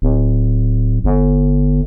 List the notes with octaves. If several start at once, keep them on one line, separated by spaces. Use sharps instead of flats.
D1
G1